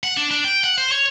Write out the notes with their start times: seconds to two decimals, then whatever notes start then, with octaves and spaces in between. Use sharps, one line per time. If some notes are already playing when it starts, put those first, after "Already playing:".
0.04 F#5
0.17 D4
0.31 D4
0.45 G5
0.64 F#5
0.78 C5
0.92 C#5